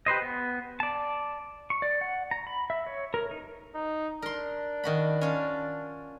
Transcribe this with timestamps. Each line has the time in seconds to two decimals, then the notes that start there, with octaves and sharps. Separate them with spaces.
0.06 G4 B4 C5 D#5
0.22 B3
0.80 D5 A5
1.70 C#6
1.82 D5
2.01 F#5
2.31 A#5
2.47 B5
2.70 E5
2.87 C#5
3.14 A#4
3.31 D#4
3.75 D#4
4.22 D4 A#4 C6
4.84 D#3 F#4 B5
5.21 C#4 F4